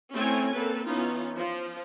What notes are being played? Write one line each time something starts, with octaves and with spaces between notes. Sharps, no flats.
A3 C4 C#4 E4 C#5 G#5
A#3 C4 A4 B4
E3 B3 C#4 D#4 F4
F3